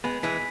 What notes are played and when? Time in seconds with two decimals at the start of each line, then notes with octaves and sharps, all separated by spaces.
0.04 G#3 B3 B5
0.23 E3 G#3 B6